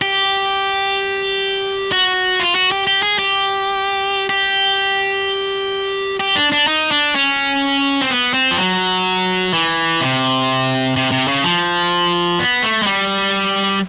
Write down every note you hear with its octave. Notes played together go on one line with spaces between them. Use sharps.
G4
F#4
F4
F#4
G4
G4
G#4
G4
G4
G4
D4
D4
D#4
D4
C#4
C4
B3
C4
F3
F#3
E3
C3
C3
C3
C#3
F3
B3
A3
G#3
G3